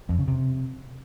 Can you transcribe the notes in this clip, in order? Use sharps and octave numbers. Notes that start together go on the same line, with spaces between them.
F2
C#3
C3